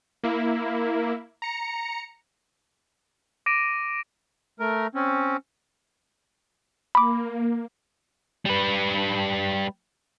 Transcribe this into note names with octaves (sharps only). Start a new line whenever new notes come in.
A#3 E4
A#5 C#7
D6 A#6 D7 D#7
A3 A#4
C4 C#4
A#3 B5 D6
G3 B4